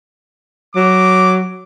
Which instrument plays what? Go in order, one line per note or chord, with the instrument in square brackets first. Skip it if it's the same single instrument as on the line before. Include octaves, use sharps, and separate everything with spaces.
[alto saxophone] F#3 [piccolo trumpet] D6